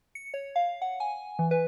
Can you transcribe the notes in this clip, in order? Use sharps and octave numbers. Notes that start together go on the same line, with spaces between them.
C#7
C#5
F5
F#5
G#5
E3
B4